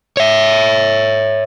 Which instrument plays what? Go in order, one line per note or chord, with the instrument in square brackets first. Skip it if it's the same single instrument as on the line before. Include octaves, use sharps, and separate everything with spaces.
[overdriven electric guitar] C#5 E5